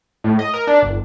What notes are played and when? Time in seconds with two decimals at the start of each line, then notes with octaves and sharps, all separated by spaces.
0.24 A2
0.39 D#5
0.54 A#4
0.67 D4
0.82 G1